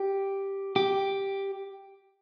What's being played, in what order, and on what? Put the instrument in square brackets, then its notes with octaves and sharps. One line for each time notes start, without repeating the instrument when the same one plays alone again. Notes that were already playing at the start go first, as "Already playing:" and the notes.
Already playing: [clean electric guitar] G4
G4